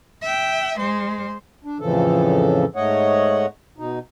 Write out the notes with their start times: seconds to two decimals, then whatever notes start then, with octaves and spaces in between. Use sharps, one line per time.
0.22 E5 G5
0.78 G#3 C5
1.64 D4
1.80 F2 A2 C#3 E3 F3 A4
2.76 G#2 A3 C#5 D#5 F#5
3.78 B2 D#4